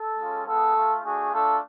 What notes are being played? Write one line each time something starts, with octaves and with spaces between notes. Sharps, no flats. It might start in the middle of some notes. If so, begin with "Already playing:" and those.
Already playing: A4
G#3 C#4 F4
G#3 B3 F4 A4
A3 F4
A3 D4 F#4 G#4
A3 D4 F4 A4